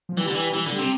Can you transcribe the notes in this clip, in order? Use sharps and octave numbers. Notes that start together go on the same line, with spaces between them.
F3
E3 G3
D3
E3
E3
D3
G3
C3